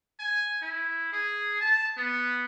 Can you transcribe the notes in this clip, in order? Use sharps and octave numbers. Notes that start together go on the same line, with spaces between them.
G#5
E4
G#4
A5
B3